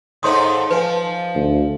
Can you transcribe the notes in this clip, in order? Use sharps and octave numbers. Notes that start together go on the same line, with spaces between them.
G#2 A3 D#4 C#5 C6 D#6
F3 B4 G#5
D2